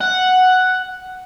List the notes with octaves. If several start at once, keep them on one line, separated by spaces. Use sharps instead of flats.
F#5